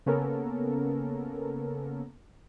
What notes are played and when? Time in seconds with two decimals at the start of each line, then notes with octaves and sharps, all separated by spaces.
0.06 C#3 A#3 B3 C#4 A4 A#4